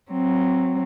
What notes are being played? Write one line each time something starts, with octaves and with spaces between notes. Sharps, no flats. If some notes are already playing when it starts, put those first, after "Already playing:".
F#3 C4